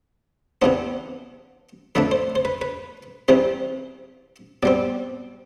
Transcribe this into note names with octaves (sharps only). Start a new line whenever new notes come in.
C3 E3 B3 D4 C5
F2 D3 A3 D4 B4
C5
C5
B4
B4
C2 C3 E3 G3 C5
B2 G3 C4 D5